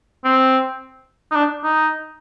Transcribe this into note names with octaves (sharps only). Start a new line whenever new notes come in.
C4
D#4
D4
D#4